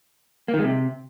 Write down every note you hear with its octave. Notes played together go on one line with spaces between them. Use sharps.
A#3
D#3
G#3
C3